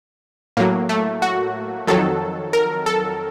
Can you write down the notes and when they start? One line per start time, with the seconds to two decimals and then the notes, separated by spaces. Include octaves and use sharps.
0.57 A2 F#3 A#3
0.89 A3
1.22 F#4
1.87 F2 D#3 F#3 A4
2.53 A#4
2.86 A4